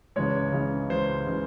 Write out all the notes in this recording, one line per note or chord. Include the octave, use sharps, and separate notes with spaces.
C#2 C#3 E3 G#3 C#5
C#2 C#3 E3 G#3
C#2 C#3 E3 G#3 C5
C#3 E3 G#3